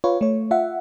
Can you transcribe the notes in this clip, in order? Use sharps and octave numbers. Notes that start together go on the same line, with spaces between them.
F4 B4 C#5
A3 C#5
F4 E5 F#5